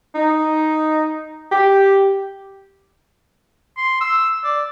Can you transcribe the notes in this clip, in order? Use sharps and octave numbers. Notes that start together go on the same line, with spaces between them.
D#4
G4
C6
E6
D5